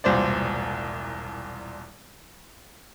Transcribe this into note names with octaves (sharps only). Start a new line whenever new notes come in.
E1 C2 A#2 C5 D5